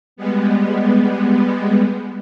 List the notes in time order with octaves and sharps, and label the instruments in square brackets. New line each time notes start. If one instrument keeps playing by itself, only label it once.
[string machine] G3 G#3 B3